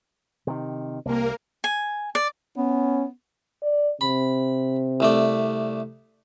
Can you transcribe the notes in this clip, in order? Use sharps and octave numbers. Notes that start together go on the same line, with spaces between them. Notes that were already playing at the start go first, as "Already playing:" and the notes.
C3 D#3
C2 C3 A#3 A#4
G#5
D5
B3 C#4
D5
C3 B5
C2 A3 D5